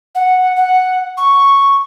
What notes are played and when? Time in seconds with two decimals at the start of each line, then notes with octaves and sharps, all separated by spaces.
0.15 F#5
0.56 F#5
1.17 C#6